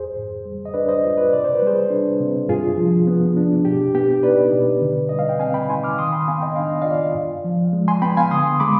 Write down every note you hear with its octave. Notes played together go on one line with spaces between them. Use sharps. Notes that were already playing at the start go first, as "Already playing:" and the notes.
Already playing: F2 G#4 C5
G#2
G3
D#5
D4 B4 D5
C5 D#5
F4
B4 D5
C3 D5
C5
B4
G3 G#4 C5
D4
C3
G2 F4 G#4
F3
B3
D4
B2 G4
B3 G4
D#4 B4 D5
B2
D3
G3 D#5
F5
G5
C4 F5 G#5
G5 B5
D#4 G#5 C6
D6 F6
D#3 C6 D#6
G5 B5
B3 F5 G#5
D#5 G5
D4 F5
D#5
F4 D5 F5
G2
F3
G#3
G#5 C6
B3 G5 B5
F5 G#5
D3 C6 D#6
G#3 B5 D6